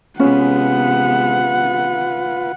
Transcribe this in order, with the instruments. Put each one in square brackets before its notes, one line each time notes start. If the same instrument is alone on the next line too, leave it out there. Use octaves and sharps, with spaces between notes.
[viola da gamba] C3 G#3 B3 [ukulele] C#4 [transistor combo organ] F4 B4 [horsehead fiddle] F#5